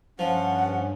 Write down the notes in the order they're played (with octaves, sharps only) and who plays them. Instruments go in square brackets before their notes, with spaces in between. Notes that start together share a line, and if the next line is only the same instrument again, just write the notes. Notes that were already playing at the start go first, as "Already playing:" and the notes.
[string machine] G2 [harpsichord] F3 [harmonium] C#4 [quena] F#5